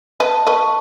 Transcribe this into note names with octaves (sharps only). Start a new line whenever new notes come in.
B4 D#5 A5
B4 D#5 C#6